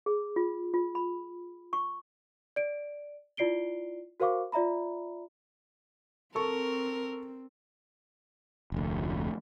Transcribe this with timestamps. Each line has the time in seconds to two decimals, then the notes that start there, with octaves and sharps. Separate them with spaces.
0.06 G#4
0.36 F4
0.74 F4
0.95 B5
1.73 C#6
2.56 D5 D7
3.37 E4 F4 D5 C7 D7 G7
4.20 F#4 A#4 C5 F5 C#6 D6
4.52 F4 D5 E5 A#5 B5
6.35 C4 A4 A#4 C#6
8.72 F1 D2